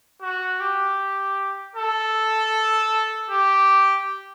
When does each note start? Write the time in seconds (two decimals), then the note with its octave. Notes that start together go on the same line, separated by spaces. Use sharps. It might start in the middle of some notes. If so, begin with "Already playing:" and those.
0.22 F#4
0.60 G4
1.76 A4
3.30 G4